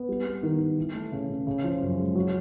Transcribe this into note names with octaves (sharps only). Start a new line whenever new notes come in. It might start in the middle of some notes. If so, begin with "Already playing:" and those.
Already playing: B3
G3
B3
D#3
D#3
E3
A3
C#3
C#3
C#3
F3
F#2
G#3
F#3